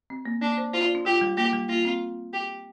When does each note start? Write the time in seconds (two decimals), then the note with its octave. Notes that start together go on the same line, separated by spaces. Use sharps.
0.10 C4
0.25 A#3
0.42 A#3 D4
0.58 C5
0.73 F4 C5
0.84 D5
0.95 D4
1.05 F4 G4
1.21 G3
1.37 A#3 G4
1.53 G3
1.69 A#3 F4
1.85 C4
2.33 G4